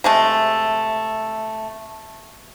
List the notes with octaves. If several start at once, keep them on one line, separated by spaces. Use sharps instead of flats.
C3 G#3 A3